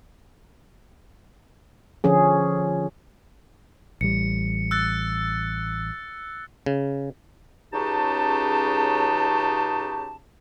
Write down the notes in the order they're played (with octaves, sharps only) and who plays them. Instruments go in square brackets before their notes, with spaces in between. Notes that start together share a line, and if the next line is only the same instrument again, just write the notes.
[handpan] D3 F3 C#4 G#4
[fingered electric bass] A1 G3 [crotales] C#7
[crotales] E6 F#6 A6
[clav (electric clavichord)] C#3
[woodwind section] C#2 C#3 D#4 F#4 G4 A5